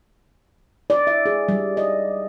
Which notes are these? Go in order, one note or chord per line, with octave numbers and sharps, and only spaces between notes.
D5
E5
G#4
G3
D#5